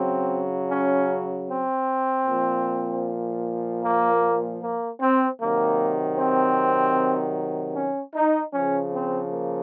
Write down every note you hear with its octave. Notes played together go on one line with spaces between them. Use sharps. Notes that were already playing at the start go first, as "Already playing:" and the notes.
Already playing: C#3 F#3 C4
C#4
C4
A#2
F3
A#3
A#3
C4
C3 D#3 F#3 A#3
C4
C#4
D#4
C#3 F3 C#4
C4
A#3